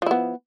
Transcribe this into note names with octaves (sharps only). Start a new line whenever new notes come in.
F3 B3 E4